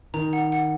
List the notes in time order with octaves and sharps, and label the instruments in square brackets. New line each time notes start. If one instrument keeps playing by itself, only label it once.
[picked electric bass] D#3 [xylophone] A#5
[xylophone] F#5
F#5